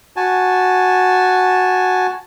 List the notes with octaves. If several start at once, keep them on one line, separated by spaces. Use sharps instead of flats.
F#4 G#5 A5